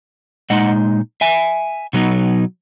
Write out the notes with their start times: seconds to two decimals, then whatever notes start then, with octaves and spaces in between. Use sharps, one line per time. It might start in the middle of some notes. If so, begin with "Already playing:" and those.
0.50 A#2 G#3 D#4 D#5 F#5
1.21 E5 G#5
1.93 B2 F#3 B3 D#4